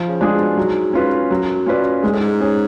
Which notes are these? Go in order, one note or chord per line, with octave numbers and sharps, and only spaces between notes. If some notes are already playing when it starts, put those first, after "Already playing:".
Already playing: F3
C#3
G#3 D4 F4 G#4
B2
G#2 F#3
C#4 F4 B4
F#2 F#3
C#4 F4 B4 D5
G#2 G#3
A2
G#2
C#4 G#4 C#5